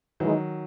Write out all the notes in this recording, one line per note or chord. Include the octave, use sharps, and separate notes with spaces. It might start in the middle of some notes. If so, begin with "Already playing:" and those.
D#3 E3 F#3 G#3 D#4